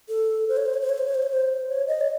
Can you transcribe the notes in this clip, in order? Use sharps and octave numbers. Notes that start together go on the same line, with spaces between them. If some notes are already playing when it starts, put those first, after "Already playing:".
A4
C5
C#5
C5
C#5
C5
C#5
C5
C#5
C5
C#5
C5
C#5
D#5
C#5